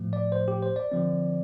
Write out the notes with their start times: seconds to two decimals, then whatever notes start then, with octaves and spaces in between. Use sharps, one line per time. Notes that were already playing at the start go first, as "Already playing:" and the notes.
Already playing: A2 F3 A3
0.13 D5
0.32 C5
0.48 G4
0.63 C5
0.76 D5
0.92 D3 F3 C4